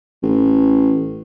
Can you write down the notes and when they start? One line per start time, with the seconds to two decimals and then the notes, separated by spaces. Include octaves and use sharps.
0.23 A1